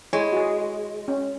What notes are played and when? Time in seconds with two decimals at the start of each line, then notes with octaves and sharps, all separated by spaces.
0.13 G#3 E4 C#5 G#5
0.32 F#4 G#4
1.08 C#4